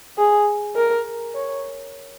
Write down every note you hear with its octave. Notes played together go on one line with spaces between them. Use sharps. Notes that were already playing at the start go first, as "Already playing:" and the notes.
G#4
A#4
C#5